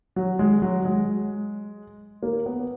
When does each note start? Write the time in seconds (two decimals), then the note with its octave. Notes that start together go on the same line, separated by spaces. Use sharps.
0.16 F#3
0.39 G#3
0.62 F#3
0.85 G#3
2.23 A#3
2.46 B3